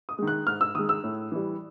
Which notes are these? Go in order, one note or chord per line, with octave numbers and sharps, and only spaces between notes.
D#6
D#3 G#3
F#6
G#2 F6
E6
D#3 G#3 D#6
E6
A2
E3 G3